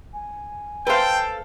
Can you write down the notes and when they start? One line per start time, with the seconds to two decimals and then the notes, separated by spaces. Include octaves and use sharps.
0.13 G#5
0.87 A4 B4 C5 F5 G5